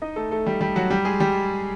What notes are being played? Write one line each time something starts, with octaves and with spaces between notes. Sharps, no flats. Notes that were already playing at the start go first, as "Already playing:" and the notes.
D#4 D#5
A3 A4
A3 A4
G3 G4
G3 G4
F#3 F#4
G3 G4
G#3 G#4
G3 G4